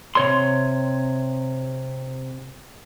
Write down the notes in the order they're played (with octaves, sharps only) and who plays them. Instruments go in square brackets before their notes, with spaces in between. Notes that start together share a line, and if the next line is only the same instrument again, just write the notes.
[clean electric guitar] C3 C#5 C6